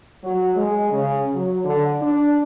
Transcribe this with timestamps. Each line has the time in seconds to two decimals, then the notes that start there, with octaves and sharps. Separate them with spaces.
0.24 F#3
0.55 G#3
0.91 C#3
1.34 F#3
1.65 D3
2.02 D4